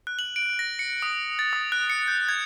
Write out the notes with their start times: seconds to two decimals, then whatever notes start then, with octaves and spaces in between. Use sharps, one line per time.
0.07 F#6
0.19 F#7
0.36 D7
0.59 A#6
0.79 C#7
1.02 D#6
1.39 A6
1.53 D#6
1.72 F#6
1.90 C#7
2.08 G6
2.29 G#6